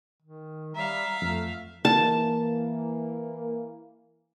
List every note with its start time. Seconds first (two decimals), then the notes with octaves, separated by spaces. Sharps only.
0.22 D#3
0.75 G3 E5 F5 A#5
1.22 F2 A3
1.85 E3 A#3 A5